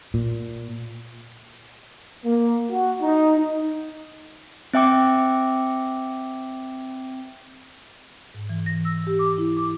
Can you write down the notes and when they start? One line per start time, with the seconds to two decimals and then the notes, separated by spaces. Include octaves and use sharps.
0.14 A#2
2.25 A#3
2.72 F#4
3.02 D#4
4.74 C4 E5 G5 D6
8.34 G#2
8.49 E3
8.66 A#6
8.85 E6
9.07 G4
9.19 D6
9.38 E4
9.57 D6